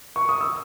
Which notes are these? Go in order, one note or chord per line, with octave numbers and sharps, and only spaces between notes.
C#6
D#6
E6